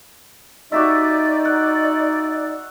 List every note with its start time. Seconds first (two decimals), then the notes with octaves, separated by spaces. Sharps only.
0.72 D#4 F#4 G4 D5 E5
1.45 F#5